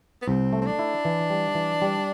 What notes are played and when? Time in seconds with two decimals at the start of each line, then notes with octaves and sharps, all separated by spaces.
0.22 B3
0.28 C2 C4
0.53 A3
0.62 C4
0.66 D4
0.79 E4
1.05 E3
1.30 G3
1.55 E3
1.82 G3